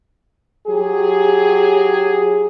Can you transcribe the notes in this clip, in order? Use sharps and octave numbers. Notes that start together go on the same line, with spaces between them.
F#3 G4 G#4